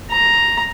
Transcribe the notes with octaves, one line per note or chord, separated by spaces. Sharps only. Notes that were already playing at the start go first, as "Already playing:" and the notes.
A#5